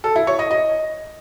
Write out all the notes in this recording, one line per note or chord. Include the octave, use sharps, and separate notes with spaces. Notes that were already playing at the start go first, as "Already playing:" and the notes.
A4
E4
C#5
D#5
D#5